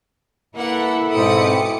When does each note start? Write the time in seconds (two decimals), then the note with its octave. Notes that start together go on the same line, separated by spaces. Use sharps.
0.56 A#3 E4 A4 B4 E5 F#5
1.14 G#2 B2 C4 D6 D#6 C#7